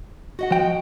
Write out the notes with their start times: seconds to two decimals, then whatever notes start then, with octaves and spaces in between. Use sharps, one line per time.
0.39 F#4 D#5 F#5
0.51 F3 G5